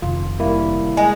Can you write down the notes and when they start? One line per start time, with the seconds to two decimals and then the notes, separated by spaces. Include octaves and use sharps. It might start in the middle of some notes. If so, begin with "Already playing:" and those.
0.02 F1 D#3 F4
0.40 G3 A#3 E4
0.97 G#3